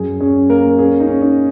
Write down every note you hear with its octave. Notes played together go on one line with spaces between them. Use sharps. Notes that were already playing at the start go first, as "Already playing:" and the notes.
Already playing: F#2 G#4
C#4 G#4
A#3 A#4
C#4 G#4
D#4
C#4
D#4